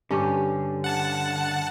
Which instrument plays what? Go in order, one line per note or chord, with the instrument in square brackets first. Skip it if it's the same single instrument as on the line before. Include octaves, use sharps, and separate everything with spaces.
[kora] G2 C#4 G4 [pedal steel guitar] D3
[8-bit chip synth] F#5 A5